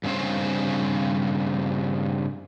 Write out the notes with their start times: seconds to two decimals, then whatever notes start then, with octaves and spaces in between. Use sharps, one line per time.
0.04 G2 C#3 C4 C#4 C5